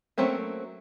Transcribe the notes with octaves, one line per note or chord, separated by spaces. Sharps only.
F#3 A3 A#3 C4 C#4